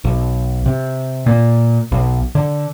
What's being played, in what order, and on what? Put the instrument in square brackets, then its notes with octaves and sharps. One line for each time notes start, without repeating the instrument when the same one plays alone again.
[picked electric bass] B1
C3
A#2
B1
D3